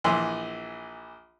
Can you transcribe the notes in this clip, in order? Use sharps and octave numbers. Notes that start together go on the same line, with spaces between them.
A#1 E3 C6